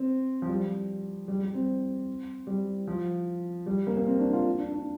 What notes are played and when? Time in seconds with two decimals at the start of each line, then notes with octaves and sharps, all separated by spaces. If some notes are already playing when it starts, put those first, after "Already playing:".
Already playing: C4
0.42 F3
0.49 G3
1.28 G3
1.41 G3
1.54 C4
2.47 G3
2.87 F3
3.66 G3
3.87 A#3
3.97 A#3
4.06 C4
4.19 D4
4.33 F4
4.58 D4
4.72 D4